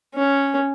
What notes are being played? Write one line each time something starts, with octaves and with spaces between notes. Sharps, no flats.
C#4